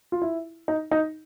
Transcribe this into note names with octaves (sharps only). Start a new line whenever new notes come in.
F4
E4
D#4
D#4